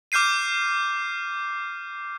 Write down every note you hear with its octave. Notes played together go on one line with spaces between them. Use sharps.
D6 F6 G6 C7 D#7